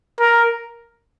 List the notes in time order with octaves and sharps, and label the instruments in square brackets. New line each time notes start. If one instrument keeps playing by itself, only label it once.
[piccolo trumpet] A#4